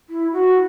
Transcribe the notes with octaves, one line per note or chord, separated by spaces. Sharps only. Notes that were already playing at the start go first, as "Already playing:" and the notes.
E4
F#4